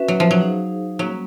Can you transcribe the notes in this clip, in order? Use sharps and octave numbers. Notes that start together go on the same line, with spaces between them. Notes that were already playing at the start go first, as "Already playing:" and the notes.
Already playing: C#4 F#4 B4 E5
F#3
F3
F#3
D#4 G#4 C5 F5
F#3 G3 A#3 C#4